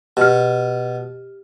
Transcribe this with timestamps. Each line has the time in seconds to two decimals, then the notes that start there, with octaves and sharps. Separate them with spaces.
0.17 B2 G4 F6